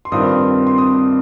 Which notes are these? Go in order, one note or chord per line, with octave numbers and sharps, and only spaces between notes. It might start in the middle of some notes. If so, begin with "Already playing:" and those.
C6
G2 D#3 C4 F4 D#6
C6
D#6